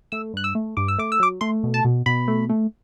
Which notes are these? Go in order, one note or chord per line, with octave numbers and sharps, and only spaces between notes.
A3 E6
G2 F#6
E6
A3
G2 D6
E6
A3 D6
E6
F#3 D6
A3 C6
B2
A5
B2
B2 B5
A3
A3